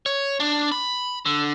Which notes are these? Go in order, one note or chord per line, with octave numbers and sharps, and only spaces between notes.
C#5
D4
B5
D3